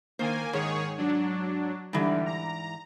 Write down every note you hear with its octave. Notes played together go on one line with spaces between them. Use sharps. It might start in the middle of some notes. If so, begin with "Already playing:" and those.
D#3 A#3 C5 G#5
G#2 D#3 G#4 C#5
F#3 D4
G#2 D3 E3 G3 D5
A#5